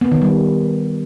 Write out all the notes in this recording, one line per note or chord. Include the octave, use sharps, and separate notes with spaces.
B3
D#3
G3